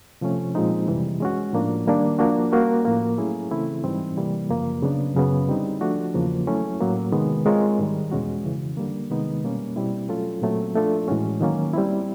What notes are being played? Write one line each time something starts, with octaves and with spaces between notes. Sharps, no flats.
C3 F3 A3 C#4
A#2 F3 G#3 C4 D#4
F2 C3 E3 G3
G#3 C#4 F#4
A2 F3 A#3 D4
D#3 G3 A#3 D4
F3 A#3 D4 F#4
G3 A#3 C#4 F#4 A#4
A2 F3 A#3
F#3 A3 C#4 E4 G#4
C#3 E3 A3 C4 E4
G#2 E3 G3 C4 D#4
C3 E3 G3 A#3
F#2 C#3 F3 A#3
C#3 F#3 B3 D4
F#2 C#3 F#3 B3
D3 G3 C4 D#4
F3 A3 D4 F#4
E2 C#3 F3 A#3
F#3 A3 C#4 E4
A2 F#3 A#3
C3 D#3 G#3 B3
G#3 C4 F4 A#4 C#5
G#2 D#3 G3
E2 B2 G#3 C#4 F#4
F2 C#3 E3
D3 G3 A#3
C3 D#3 G#3 B3 D#4
B2 G3 A#3 C#4
B2 G3 C4 E4
F#3 A3 C#4 F4 A4
A#2 F#3 A3 C4
F3 A3 D4 F4 A4
A2 E3 G#3 C#4 F#4
D#3 F#3 A#3 C#4
G3 C4 E4